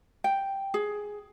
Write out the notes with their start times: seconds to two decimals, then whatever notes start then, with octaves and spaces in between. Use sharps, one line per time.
0.24 G5
0.74 G#4